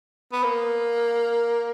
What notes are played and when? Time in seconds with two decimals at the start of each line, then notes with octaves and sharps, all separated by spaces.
0.32 B3
0.44 A#3